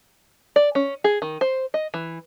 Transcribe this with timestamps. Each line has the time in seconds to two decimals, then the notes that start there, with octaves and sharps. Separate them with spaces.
0.56 D5
0.75 C#4
1.04 G#4
1.22 D#3
1.41 C5
1.74 D#5
1.94 E3